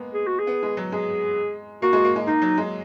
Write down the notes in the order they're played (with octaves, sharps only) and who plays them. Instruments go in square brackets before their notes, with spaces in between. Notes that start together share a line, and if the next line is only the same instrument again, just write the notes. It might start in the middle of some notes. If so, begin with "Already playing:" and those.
Already playing: [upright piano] G#3 A#3 B3
[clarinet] G#4
F#4
G#4
[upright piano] B3
G#3
F#3
[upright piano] G#3 [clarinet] G#4
[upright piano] A#3 [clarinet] F#4
[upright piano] G#3
A#3
G#3
[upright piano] A#3 [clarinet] D#4
[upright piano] F#3
G#3